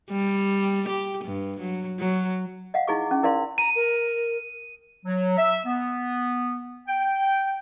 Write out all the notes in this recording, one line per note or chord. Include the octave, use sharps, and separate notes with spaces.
G3
G4
G2
F#3
F#3
D#5 F5 F#5
D#4 E4 G#4 C#6 D6
C#4
E4 A#4 D5 F5 C6
A#5 D#7
A#4
F#3
E5
B3
G5